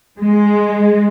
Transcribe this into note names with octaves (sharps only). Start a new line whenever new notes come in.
G#3